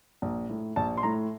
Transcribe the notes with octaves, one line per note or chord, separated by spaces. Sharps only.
A#1
A2
A#1 A5
C6
A2 A#5